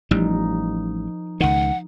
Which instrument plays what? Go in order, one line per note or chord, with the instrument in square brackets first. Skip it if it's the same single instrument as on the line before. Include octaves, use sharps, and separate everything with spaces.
[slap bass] A1 G3 [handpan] F3 D#4
[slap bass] C#2 D#3 [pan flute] F#5